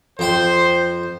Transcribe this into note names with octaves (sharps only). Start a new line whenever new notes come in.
F2 C5 G5 C6